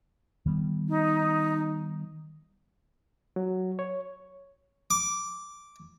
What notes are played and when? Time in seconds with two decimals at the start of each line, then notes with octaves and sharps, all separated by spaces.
0.46 D#3 G3 B3
0.89 D#4
3.36 F#3
3.79 C#5
4.91 D6